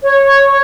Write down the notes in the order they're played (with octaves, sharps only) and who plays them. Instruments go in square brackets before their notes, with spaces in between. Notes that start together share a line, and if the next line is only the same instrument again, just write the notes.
[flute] C#5